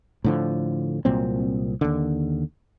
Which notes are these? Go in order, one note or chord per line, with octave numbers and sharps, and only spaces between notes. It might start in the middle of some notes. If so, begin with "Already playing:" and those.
A2 D3 F3
C2 A#2 F#3 C4
D#2 D3